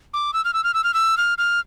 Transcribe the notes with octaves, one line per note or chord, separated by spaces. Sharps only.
D6
E6
F6
E6
F6
E6
F6
E6
F6
F6